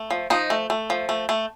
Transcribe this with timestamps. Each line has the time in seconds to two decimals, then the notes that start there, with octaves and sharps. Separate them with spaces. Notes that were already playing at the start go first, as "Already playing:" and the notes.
Already playing: A3
0.11 F3
0.30 F3 D#4
0.50 A3
0.70 A3
0.90 F3
1.09 A3
1.29 A3